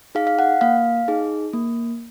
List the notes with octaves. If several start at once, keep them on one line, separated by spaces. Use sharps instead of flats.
D#4 G#4 F5
F5
F#5
A#3 F5
D#4 G#4
A#3